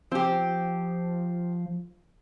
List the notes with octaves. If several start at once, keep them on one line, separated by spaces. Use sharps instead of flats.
F3 C4 G4